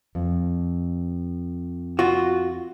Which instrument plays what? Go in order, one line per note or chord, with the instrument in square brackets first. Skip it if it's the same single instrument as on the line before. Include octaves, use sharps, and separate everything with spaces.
[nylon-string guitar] F2
[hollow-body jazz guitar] F4 F#4